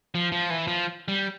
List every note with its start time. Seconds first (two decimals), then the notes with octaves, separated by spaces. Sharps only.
0.15 F3
0.32 F3
0.50 E3
0.67 F3
1.08 G3